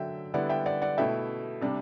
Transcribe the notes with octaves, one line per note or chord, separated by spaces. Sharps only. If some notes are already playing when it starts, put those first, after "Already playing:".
Already playing: D3 F#3 A3 E5 G5
D3 G3 B3 E4 D5 F#5
E5 G5
D5 F#5
D5 F#5
B2 A3 E4 E5 G5
C3 G3 D4